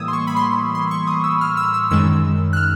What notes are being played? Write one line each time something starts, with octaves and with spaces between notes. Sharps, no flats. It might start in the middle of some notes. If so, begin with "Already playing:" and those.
Already playing: A2 E3 G3 A#3 D#6 E6 G#6
C6
C#6
B5
C6
C6
C#6
D#6
E6
F6
E6
E6
F#2 D#3 G#3 E6
F#6
F6